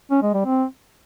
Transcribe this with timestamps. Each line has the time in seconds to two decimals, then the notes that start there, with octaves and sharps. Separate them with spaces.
0.11 C#4
0.22 G#3
0.34 G3
0.45 C4